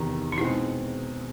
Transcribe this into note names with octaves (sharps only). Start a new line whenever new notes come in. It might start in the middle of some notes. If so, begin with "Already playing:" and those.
Already playing: E2 C3 D#3
D#4
B2 G#3 C4 E4